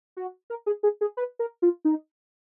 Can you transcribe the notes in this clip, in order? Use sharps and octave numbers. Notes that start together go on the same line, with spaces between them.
F#4
A#4
G#4
G#4
G#4
B4
A#4
F4
D#4